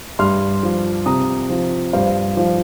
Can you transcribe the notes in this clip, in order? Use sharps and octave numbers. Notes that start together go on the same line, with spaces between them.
G2 C6 F6
F3
C3 A#5 D#6
F3
G2 C5 F5
F3